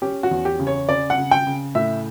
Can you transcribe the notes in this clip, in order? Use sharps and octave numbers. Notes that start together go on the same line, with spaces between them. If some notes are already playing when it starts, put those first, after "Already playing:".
C#4 G4
F#4
E2
G4
C#3
C#5
C#3 D5
F#5
C#3
G5
C#3
A2 E5